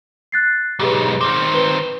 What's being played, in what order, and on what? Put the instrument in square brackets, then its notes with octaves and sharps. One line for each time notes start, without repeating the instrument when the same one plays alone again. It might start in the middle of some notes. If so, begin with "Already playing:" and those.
[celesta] F#6 A6 C7
[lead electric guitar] B1 G#2 [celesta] G4 G#4 B4
[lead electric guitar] D#3 C4 [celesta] D6
[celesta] B4 G7